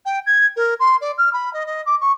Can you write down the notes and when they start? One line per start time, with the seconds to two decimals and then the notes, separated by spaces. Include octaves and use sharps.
0.06 G5
0.26 G#6
0.56 A#4
0.80 C6
1.01 D5
1.18 F6
1.33 B5
1.53 D#5
1.66 D#5
1.86 D6
2.01 C#6